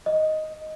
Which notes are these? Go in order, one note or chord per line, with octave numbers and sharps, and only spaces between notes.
D#5